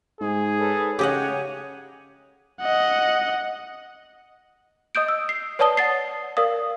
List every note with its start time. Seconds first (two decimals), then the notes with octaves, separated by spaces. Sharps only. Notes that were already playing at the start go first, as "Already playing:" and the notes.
0.21 G#2 G#4
0.58 A4 B4 C#5
0.99 C#3 G4 C#5 D#5 F#5 G#5
2.60 D#5 F#5
4.95 D#5 D#6 G6 D7
5.08 E6
5.29 C7
5.59 B4 C#5 D5 A5 D#6 G7
5.77 F#5 A6 C7
6.37 A#4 D5 F5 D#6